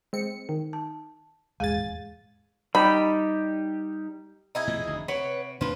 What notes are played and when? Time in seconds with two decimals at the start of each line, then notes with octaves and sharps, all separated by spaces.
0.13 G#3 C4 C#7
0.49 D#3
0.73 A5
1.60 D#1 E2 G#2 G#3 G#4 G#5 A6
2.75 G3 D#4 G4 B5
4.55 D#4 E4 G#4
4.67 A2 C3 F3
4.86 F1 D2
5.08 C3 B4 C#5 F#5
5.61 A2 F3 D4 B4